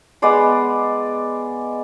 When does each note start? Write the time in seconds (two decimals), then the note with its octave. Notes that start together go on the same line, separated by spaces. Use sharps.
0.22 G#3 B3 D5 C6